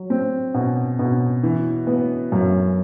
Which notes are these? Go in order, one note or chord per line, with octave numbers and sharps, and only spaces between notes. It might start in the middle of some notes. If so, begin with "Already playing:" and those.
Already playing: F#3
C4
B2
B2
E3
B3
F#2